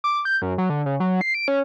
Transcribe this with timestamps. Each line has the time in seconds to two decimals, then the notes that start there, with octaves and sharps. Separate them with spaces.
0.04 D6
0.25 G6
0.42 F#2
0.58 F#3
0.70 D3
0.86 C#3
1.00 F#3
1.21 C7
1.34 D7
1.48 C#4